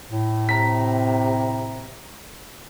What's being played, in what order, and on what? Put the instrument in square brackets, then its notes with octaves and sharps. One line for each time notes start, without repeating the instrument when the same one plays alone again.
[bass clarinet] A2
[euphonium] C3 [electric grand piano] A#5 B6